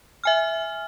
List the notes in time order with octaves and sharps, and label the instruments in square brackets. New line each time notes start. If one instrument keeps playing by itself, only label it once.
[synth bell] E5 G#5 F6